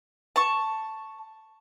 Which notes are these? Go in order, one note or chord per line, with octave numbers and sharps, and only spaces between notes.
A5 C#6